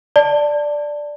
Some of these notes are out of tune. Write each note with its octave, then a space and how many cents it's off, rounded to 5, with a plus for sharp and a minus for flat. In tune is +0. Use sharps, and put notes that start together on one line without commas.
D5 +0 A5 +15